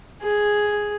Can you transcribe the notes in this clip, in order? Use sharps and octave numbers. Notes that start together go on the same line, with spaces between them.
G#4